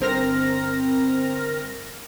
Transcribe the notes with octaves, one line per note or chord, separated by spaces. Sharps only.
G1 C4 A#4 F6 A#6